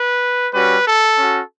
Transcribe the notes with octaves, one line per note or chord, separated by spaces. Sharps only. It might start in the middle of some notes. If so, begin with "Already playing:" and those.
Already playing: B4
G3 C#4 F#4 B4
A4
C#4 F#4